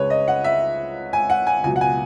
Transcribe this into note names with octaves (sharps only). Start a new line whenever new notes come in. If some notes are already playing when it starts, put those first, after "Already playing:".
Already playing: C#2 C#3 G#3 B4 C#5
D#5
F#5
E5
G#5
F#5
G#5
C#2 B2 F#3 G#5
F#5
G#5